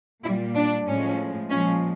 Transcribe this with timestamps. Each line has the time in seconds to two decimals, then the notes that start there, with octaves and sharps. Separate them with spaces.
0.24 A#2 G3 E4
0.56 D4
0.87 A2 F3 G#3 C#4
1.49 A#2 F3 G#3 C#4